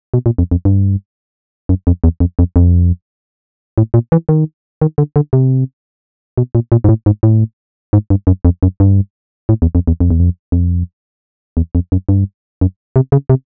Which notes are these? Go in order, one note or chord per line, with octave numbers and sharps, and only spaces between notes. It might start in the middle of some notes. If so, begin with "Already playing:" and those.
B2
A#2
F2
F2
G2
F#2
F2
E2
F2
F2
F2
A2
A#2
E3
D#3
D#3
D3
D3
C3
B2
A#2
A#2
G#2
A2
G#2
A2
G#2
G2
F#2
F2
F#2
G2
A2
E2
F2
E2
F2
E2
F2
F2
E2
F2
F#2
G2
F#2
C3
C#3
C3